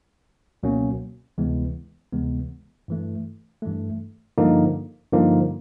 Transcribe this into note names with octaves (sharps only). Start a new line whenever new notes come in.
C#2 B2 F#3 A#3 C#4
D2 C3 E3 G#3 B3
D2 C3 E3 G#3 B3
G2 E3 A3
G2 E3 A3
G2 D3 F3 A#3 D#4
G2 D3 F3 A#3 D#4